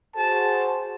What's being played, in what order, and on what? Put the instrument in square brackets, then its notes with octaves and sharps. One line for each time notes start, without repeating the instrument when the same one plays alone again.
[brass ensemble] F#4 G#4 C5 [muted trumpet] A5